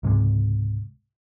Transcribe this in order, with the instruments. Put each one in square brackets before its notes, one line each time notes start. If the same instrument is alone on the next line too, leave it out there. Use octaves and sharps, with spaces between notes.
[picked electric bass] C#2 G#2 C3 G#3